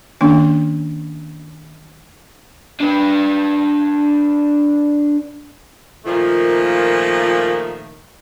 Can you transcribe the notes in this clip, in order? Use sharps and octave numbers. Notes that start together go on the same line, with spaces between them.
D#3 A#3 C#4 D4
D4 B4
A#2 D#3 F3 A3 A#3